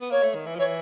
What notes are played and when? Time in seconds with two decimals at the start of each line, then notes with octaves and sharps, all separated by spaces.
0.01 B3
0.10 A#3 C#5
0.23 A3
0.35 D#3
0.46 E3
0.55 F3
0.58 E3 C#5